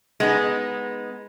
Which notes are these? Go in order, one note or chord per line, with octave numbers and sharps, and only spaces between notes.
G#3 B3 D#4